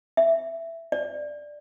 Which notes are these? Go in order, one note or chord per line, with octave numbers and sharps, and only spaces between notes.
E5
D5